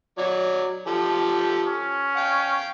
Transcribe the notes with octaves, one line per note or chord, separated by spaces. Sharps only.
F#3 C#5 D5
F3 G4 A4
C#4
F5 G5